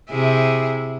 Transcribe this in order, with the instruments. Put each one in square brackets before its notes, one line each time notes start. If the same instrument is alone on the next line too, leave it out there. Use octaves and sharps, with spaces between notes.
[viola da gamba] C3 E4 G#4